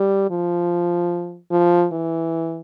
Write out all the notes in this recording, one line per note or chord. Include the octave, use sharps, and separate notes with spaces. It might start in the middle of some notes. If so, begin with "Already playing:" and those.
Already playing: G3
F3
F3
E3